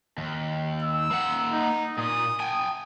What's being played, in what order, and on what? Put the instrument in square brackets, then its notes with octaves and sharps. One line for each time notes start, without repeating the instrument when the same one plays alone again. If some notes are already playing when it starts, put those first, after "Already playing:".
[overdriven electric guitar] D#2
[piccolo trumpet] E6
[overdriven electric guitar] A#3 F#5
[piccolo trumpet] D#4
[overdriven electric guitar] A#2 [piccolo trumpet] D#6
[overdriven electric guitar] G5 G#5